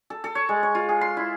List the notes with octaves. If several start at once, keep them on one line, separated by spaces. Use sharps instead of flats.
A4
A4
C#5
G#3
C#5
F4
G#4
C6
E4